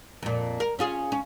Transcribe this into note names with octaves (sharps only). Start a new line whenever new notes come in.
F2 A#2
A#4
C#4 F4 G#4
C#4